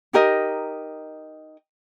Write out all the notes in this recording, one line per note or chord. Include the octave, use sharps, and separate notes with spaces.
D#4 G4 A#4 D#5